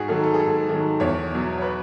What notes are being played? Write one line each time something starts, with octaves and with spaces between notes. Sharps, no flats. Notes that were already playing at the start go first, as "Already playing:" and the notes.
Already playing: G#2 F#4 G#4
D#3 F#3 A4
A4
G#4
G#2 A4
D#3 F#3
E2 C#5
B2 F#3
C#5
B4